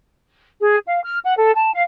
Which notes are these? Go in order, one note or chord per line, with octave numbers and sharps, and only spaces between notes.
G#4
F5
F6
F#5
A4
A5
F5